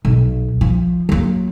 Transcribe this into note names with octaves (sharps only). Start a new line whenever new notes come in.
B1
F3
F#3 A#3